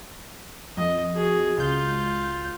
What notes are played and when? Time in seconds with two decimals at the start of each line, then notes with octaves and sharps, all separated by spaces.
0.77 F2 D#5
1.13 F#4 G#4
1.58 C#2 F4 G6